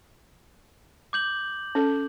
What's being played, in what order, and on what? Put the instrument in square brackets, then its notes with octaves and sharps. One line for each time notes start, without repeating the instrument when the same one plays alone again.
[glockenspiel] D6 G6 F#7
[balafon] C#4 A4